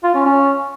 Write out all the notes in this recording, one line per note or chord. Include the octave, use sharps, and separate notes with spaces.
F4
C#4
C#4